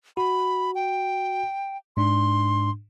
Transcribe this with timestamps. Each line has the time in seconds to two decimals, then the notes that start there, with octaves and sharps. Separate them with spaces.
0.17 F#4 B5
0.75 G5
1.97 G#2 D4 C6